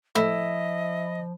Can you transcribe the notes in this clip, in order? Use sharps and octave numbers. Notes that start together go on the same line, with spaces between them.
A2 F3 E4 D#5 B5 D#6